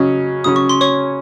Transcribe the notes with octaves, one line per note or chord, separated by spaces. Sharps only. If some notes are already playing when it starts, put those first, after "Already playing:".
Already playing: C#3 F#3 C#4 D#5 D#6
C#3 F#3 C#4 D#6
C#6
C6
C#5 C#6